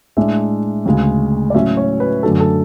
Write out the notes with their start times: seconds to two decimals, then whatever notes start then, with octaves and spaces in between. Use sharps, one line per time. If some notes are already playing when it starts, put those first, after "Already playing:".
0.17 A2 G#3 D4 E5
0.86 D2 C#3 G#3
1.50 D5
1.55 A2 F#3 C#4 E5
1.77 C#5
2.00 B4
2.23 F#2 D3 F#3 A3 A4
2.40 A4